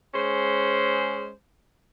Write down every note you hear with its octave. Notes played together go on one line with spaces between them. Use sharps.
G#3 C#4 G#4 C5